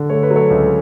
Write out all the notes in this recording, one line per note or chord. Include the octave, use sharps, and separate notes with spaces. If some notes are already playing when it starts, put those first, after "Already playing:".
Already playing: D3
A3 C#5
B4
F#3
A4 C#5
C#2